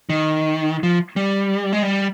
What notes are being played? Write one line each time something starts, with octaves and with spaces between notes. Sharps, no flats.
D#3
F3
G3
G#3
G3